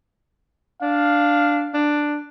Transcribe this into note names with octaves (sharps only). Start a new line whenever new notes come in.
D4 F5
D4